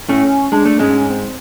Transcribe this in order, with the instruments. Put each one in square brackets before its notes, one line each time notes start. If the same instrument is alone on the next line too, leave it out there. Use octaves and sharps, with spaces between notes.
[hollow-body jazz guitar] A2 A3 [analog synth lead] C#4
[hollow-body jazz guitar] G#3 [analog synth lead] D4
[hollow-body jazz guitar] A3
[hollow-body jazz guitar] G#2 G#3 [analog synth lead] C#4
[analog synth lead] C4